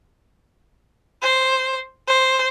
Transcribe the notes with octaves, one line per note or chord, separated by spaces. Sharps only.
C5
C5